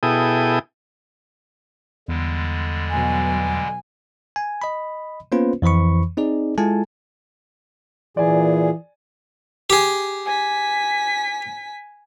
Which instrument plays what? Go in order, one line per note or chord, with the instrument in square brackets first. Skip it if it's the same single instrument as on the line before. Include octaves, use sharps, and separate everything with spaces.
[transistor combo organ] B2 E4 G#4 A4 G5 D#6
[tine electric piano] E2 [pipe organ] D3 G3 G#3
[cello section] B2 F#3 [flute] G#5
[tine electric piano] G#5
D#5 B5
A#3 B3 C#4 F4 B4 C5
F2 E3 C5 B5 C#6
C4 D#4 G#4 D5
G#3 E4 F4 A4 G#5 A5
[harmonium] A#2 G#4 [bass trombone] E3 [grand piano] D5 G#5
[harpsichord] G4 G#4
[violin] G#5 B6